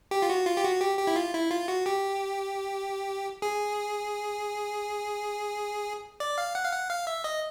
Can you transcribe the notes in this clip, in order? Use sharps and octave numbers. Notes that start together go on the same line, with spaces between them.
G4
F4
F#4
F4
G4
F#4
G4
G4
E4
F4
E4
F4
F#4
G4
G#4
D5
F5
F#5
F5
F#5
F5
E5
D#5